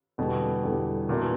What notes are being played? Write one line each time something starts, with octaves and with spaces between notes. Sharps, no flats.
E2 B2 D3 G3
E2 D3 G3
A#2 E3 B3 D4 F#4 B4